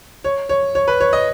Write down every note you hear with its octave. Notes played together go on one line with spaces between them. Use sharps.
C#5
C#5
C#5
B4
C#5
D#5